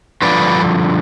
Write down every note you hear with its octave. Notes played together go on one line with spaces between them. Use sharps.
G2 D3 F3 B4 D5